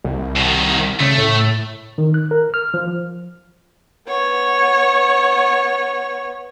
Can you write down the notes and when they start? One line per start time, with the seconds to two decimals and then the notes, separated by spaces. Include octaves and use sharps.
0.04 C2
0.36 B2 D#3
1.00 C#3 A3
1.18 A2
1.98 D#3
2.14 F#6
2.31 A#4
2.54 F6
2.74 F3
4.07 B3 C#5